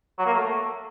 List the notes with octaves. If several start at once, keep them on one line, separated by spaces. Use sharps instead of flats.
F#3
A#3
A3